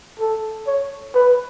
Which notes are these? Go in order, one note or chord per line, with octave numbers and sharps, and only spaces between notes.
A4
C#5
B4